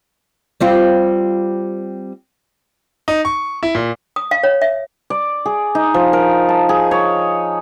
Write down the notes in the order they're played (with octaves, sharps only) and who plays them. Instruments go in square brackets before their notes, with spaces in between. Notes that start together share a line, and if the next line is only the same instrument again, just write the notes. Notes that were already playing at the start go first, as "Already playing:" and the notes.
[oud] G3 C4 F4
[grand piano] D#4
C#6
E4
A#2
[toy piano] D#6
F5
C#5
E5
[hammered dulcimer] D5
G#4
D#4
F3
A#4
A5
G#4
C#5